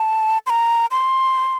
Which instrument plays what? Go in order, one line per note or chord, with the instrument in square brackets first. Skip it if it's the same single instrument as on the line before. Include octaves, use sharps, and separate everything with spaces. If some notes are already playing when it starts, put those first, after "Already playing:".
Already playing: [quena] A5
C6
A#5
C6